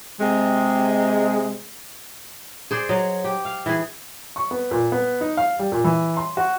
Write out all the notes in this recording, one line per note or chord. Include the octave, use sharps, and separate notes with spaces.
C3 G#3
G#4 C5 D5
F#3 D#5
G4
F5
E3 G#4
C#6
B3
A#2
B3
D#4
F5
G3
A#2
E3
C6
F#4